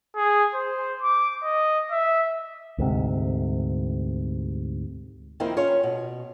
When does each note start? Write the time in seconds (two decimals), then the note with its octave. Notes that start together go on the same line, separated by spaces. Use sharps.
0.16 G#4
0.54 C5
1.02 D6
1.43 D#5
1.91 E5
2.78 D2 G#2 C3
5.40 D#3 F3 A#3 C4 D#4 E4
5.57 C#4 F4 C#5
5.83 B2